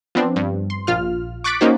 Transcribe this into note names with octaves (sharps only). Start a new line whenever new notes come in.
F3 B3 C4 D4
G2
C6
A#1 F4 F6
C#6 D6 F#6 A6 B6 D7
A#3 C#4 D#4 F#4 C5